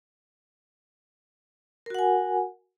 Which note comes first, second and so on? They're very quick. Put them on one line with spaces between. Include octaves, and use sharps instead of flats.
A#4 F#4 F#5 G#5